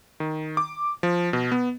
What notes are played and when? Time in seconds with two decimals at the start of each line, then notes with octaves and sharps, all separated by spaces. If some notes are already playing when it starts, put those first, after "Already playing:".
0.20 D#3
0.57 D6
1.03 F3
1.33 B2
1.52 B3